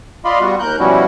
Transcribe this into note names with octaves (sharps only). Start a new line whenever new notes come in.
F4 D5 D#5 F5 B5 C6
G3 B3 F4 F#4
D#2 A#4 F#6 G6
B2 F3 G3 C#4 E4 F#4